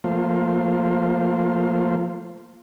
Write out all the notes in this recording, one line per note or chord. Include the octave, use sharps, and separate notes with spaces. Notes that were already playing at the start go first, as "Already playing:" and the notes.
F3 A3 A#3 F4 C5